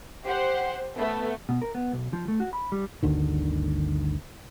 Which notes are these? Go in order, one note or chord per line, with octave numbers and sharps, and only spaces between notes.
G4 C5 F#5
A3 B3
B2
A#4
B3
B1
F3
A3
F#4
B5
G3
G1 D2 D3 D#3